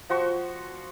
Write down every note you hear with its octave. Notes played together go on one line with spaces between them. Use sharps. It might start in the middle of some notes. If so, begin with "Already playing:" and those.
F3 F#4 C6 C#6